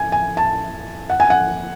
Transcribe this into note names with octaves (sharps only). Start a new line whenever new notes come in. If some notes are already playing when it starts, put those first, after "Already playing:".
Already playing: G#5
G#5
A5
F#5
G#5
F#5